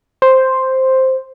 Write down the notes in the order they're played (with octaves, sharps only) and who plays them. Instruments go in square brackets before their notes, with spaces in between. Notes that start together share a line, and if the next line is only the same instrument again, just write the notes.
[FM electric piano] C5